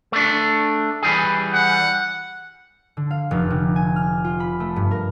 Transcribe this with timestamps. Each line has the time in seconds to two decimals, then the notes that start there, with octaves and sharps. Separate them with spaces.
0.12 A3 D4
1.03 E3 G3 G#4
1.54 F#5
2.97 D3
3.11 F5
3.31 F1
3.50 C3
3.76 G#5
3.96 F6
4.24 F4
4.40 B5
4.60 A3
4.76 G2
4.91 A#4